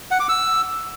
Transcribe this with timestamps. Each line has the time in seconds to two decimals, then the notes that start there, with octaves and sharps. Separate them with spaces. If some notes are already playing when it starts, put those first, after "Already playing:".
0.11 F#5
0.20 D6
0.29 E6